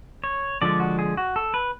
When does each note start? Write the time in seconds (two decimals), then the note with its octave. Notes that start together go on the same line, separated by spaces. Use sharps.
0.24 C#5
0.62 D3 F3 G#3 D5
0.80 F#4
0.99 G#4
1.17 F#4
1.36 A4
1.54 B4